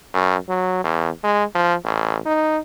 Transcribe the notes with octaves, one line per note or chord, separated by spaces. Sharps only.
F#2
F#3
E2
G#3
F3
A1
D#4